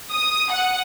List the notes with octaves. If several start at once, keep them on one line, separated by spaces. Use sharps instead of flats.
D#6
F#5